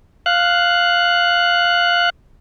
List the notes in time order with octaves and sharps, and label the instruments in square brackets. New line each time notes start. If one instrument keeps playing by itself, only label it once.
[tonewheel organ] F5 F#6